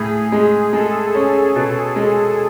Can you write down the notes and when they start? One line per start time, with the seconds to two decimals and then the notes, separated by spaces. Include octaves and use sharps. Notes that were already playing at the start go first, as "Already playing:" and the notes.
Already playing: A2 G#4
0.32 G#3
0.73 G#3 A4
1.15 C#4
1.56 B2
1.96 G#3